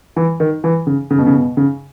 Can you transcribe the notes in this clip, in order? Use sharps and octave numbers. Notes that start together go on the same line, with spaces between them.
E3
D#3
E3
C#3
C#3
B2
C#3
B2
C#3